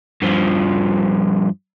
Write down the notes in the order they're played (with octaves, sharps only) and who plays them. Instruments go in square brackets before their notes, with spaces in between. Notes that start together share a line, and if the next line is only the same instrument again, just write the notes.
[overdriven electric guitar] G2 F3